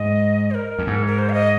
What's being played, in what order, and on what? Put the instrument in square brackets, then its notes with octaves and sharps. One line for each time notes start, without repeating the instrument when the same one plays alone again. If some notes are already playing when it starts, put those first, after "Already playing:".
Already playing: [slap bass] G#2 [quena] D#5
[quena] C5
A#4
[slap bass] F2
G#2
[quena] A#4
C5
F5
D#5